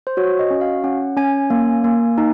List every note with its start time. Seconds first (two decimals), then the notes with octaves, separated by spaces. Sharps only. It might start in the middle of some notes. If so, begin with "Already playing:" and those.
0.07 C5
0.17 F#4 C#5
0.39 D#5
0.51 C#4
0.61 F5
0.84 C#4 F#5
1.17 C#4 G#5
1.50 A#3
1.84 A#3
2.18 D#4